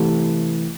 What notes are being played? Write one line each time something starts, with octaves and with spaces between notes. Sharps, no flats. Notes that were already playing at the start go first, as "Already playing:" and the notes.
Already playing: C3 E3 A3